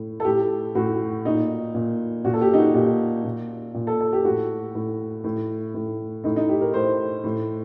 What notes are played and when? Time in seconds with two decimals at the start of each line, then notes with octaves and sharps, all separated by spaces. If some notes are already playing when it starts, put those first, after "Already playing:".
Already playing: A2
0.20 A4
0.25 A2 G4
0.75 A2 F#4
1.25 A#2 D#4
1.74 A#2
2.25 A#2 F#4
2.33 A4
2.41 G4
2.53 D#4
2.58 F#4
2.74 A#2 G4
3.24 A#2
3.74 A#2
3.87 A4
4.00 A4
4.13 G4
4.25 A2 F#4
4.75 A2
5.24 A2
5.74 A2
6.24 A2 D#4
6.36 D#4
6.49 G4
6.61 A#4
6.74 A2 C5
7.24 A2